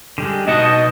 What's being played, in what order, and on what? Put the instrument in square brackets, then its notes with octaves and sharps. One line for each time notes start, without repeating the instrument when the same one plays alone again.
[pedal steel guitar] D3 G3 G#3
[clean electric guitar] B2 D#4 F#5 [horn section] D#5 [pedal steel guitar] A5